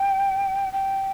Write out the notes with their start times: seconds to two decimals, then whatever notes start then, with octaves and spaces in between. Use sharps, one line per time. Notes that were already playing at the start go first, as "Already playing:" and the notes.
Already playing: G5
0.72 G5